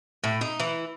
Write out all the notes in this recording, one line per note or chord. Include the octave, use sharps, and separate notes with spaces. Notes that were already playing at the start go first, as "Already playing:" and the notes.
A2
D#4
E3